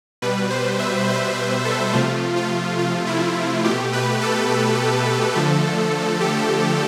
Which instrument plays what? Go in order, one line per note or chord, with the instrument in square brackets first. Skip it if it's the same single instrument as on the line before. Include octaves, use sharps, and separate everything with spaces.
[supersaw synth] B2 G3 B4
C5
E5
C5
B4
A4
C3 F3 A3 F4
F4
F4
E4
B2 A3 G4
B4
A4
D3 F3 A3
G4